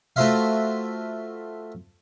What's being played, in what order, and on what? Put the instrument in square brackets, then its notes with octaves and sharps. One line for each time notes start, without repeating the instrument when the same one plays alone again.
[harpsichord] A3 F4 F#4 C5 E5 F5